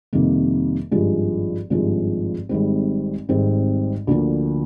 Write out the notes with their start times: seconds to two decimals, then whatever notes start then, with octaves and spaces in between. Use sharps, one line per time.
0.13 F2 C3 D#3 G3 A#3
0.91 G#1 G2 F3 G#3
1.70 G#1 G2 F3 G#3
2.49 G#1 G#2 G3 C4
3.29 G#1 G#2 G3 C4
4.07 D2 D3 F3 A#3 D4